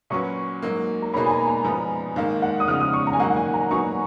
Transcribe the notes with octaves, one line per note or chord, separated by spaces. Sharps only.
A#2 F#3 C#4 F#4 B4 C#6
G#2 F#3 A#3
A#5
B2 A#3 D#4 G#4 C#5 B5
G#5
A#5
A#5
G#2 F3 B3 D#4
G#2 D#3 A#3 F5
F#5
D#6
C#3 F3 G#3 D#4 F6
D#6
C#6
A#5
G#5
G#2 D#3 F#3 A#3 F#5
F#5
G#5
A#5
F#3 A#3 D#4 F#4 B4 C#6